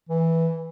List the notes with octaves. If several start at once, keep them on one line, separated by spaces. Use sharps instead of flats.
E3